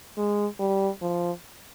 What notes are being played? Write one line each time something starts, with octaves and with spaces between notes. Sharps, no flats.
G#3
G3
F3